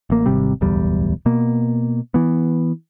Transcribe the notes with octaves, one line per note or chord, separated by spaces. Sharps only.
A1 A#3
G#1 C3 G3
D1 B1 E2 G3
B2 A#3
E3 B3